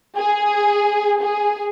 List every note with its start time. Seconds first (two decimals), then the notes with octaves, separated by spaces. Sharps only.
0.16 G#4
1.21 G#4